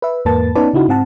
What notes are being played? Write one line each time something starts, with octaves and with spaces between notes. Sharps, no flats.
B4 E5
E2 G#2 A#3 B4 A5 A6
B3 C#4 D#4 B4 D5 A5
C#3 D#4 E4 F#4
G#2 C4 F#5 A5